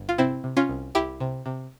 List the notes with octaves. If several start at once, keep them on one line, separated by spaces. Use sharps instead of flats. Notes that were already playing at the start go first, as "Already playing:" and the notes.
Already playing: G1
F4
C3 C4 E4
C3
C#4 F4
C2
C2 E4 G4
C3
C3